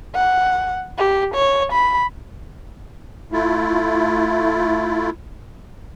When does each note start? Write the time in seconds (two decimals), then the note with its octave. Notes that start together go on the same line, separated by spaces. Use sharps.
0.15 F#5
0.98 G4
1.35 C#5
1.73 B5
3.32 A3 E4 F4